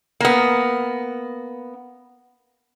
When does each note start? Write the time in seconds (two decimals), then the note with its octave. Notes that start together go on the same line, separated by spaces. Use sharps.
0.20 A#3 B3